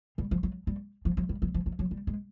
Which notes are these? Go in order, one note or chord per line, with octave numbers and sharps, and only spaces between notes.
G3
F3
F#3
G3
F3
F#3
G3
F#3
F3
F#3
F#3
G3
G#3